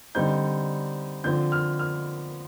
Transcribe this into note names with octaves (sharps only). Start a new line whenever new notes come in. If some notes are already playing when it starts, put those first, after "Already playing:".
D3 G3 C4 D#4 G6
D3 F3 C4 G6
F6
F6